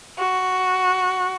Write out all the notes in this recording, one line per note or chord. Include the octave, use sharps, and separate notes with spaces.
F#4